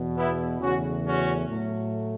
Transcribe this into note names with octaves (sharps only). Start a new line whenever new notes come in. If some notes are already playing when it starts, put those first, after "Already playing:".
Already playing: E2 B2
B3 E4
E2 C#3 A3 C#4 F#4
C#4 F#4
A2 F#3 A3